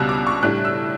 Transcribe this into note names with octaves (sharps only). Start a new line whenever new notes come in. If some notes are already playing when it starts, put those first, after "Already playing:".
Already playing: C#2 B2 G3 D4 E6 F#6
D6
C#6
A2 G3 D4 F#6
E6